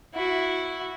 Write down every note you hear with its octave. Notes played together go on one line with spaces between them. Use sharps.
E4 F#4